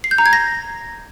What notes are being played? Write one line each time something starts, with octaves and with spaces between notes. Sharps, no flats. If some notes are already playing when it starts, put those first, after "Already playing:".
C7
G6
A#5
G#6
A#6